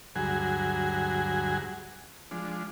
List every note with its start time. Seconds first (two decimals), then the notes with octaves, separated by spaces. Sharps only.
0.16 D2 G2 F#3 F#4 G#4 G#5
2.31 F3 G#3 D4